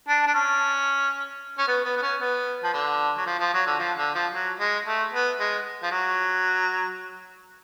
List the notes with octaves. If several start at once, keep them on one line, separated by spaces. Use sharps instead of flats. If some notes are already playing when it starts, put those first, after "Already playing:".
D4
D4
C#4
C#4
B3
B3
B3
C#4
B3
F3
D3
F#3
F3
F3
F#3
D3
F3
D3
F3
F#3
G#3
A3
B3
G#3
F3
F#3